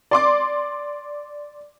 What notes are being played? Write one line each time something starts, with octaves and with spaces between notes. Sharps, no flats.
D5 C6 D6